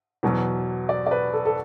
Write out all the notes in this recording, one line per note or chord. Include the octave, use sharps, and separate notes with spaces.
E2 B2 F#3
D5
D5
B4
A4
A4